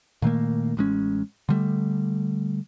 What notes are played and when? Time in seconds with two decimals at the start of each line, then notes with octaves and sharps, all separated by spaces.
0.22 A#2 D#3 A3 A#3
0.77 A1 G#3 C#4
1.49 D3 G3 A3